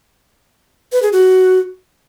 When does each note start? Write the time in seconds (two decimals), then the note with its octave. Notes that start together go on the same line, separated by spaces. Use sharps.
0.92 B4
1.03 G#4
1.13 F#4